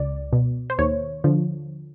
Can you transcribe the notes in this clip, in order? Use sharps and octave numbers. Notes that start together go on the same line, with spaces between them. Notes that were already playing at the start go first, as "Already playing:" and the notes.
Already playing: C#2 D5
B2
C5
D#2 C#5
D3 F3